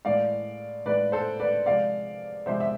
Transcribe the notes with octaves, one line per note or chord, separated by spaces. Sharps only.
A2 E3 G#3 D5 F5
A2 E3 G#3 B4 D5
A4 C5
B4 D5
C3 F3 G#3 D5 F5
C3 F3 G#3 C5 E5
E5